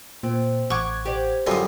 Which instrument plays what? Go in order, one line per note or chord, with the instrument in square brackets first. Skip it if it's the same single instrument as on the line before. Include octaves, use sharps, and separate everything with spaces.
[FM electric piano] A#2 [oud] C4
[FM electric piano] A1 F#5 G#6 [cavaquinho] C#6 D6
[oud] G4 C5 D5
[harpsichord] F#2 D3 G3 [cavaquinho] F4 D#6